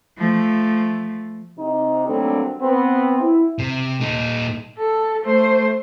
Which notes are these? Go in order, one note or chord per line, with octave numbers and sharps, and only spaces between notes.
F3 A3
C3 D#4
D3 F#3 G3 A3 A#3 C4
B3 C4
E4
C3
A#2 D#4
A4
A3 C5